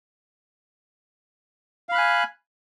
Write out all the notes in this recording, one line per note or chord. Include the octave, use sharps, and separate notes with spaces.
F5 G#5 B5 F#6